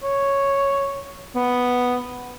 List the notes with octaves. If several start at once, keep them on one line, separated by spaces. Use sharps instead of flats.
C#5
B3